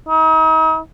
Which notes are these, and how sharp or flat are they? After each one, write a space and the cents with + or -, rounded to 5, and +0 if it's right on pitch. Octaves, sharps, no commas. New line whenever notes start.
D#4 +40